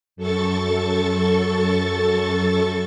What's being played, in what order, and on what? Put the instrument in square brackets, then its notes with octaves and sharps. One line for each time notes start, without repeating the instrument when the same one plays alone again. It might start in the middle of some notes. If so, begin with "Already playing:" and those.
[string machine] F#2 A4 C#6 A6